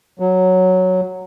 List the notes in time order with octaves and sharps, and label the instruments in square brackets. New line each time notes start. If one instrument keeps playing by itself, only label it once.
[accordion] F#3